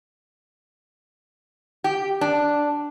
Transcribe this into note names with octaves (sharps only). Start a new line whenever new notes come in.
G4
D4